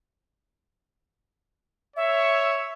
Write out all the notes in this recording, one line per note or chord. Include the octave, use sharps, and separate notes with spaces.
C#5 E5